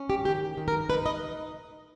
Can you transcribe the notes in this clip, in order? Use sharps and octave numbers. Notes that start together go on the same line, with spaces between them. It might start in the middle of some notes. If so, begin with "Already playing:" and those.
Already playing: C#4
G4
D#3 G4
D#3
A#4
D#4 B4
D#5